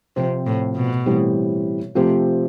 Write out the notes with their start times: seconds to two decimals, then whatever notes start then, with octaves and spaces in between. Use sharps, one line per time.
0.16 C3 F3 C4 F4
0.46 A2
0.76 B2
1.06 A2 E3 G3 C4 G4
1.95 C3 F3 A3 C4 G4